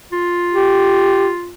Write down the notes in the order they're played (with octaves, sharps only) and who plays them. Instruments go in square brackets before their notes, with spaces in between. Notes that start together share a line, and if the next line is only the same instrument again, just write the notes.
[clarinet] F4
[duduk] G4